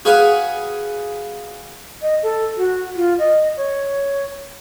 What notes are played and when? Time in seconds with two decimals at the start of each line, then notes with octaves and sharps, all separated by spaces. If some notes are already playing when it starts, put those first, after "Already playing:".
0.05 F#4 G#4 B4 F5 F#5
2.02 D#5
2.23 A4
2.57 F#4
2.96 F4
3.19 D#5
3.57 C#5